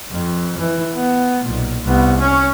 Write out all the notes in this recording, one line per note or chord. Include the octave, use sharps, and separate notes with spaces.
F2
E3
B3
B1 A#2
C2 B3
C#4